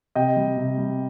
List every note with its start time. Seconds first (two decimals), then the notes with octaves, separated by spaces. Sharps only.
0.15 C3 D#5 G5
0.37 G3
0.57 C3
0.78 G3